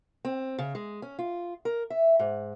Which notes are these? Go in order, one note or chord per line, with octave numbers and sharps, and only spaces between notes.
C4
C#3
G#3
C#4
F4
A#4
E5
G#2